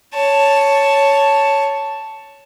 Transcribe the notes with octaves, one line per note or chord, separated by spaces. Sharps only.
C#5 A5